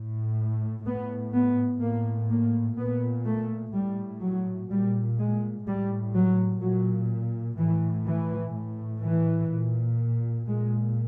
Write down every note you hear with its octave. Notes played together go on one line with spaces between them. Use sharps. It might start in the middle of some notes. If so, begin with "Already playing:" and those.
Already playing: A2
A2 B3
B3
A2 A#3
A#3
A#2 B3
A3
A2 G3
F#3
A#2 G3
G#3
A2 G3
F#3
A#2 F#3
A2 E3
E3
A2
E3
A#2
A#2 G#3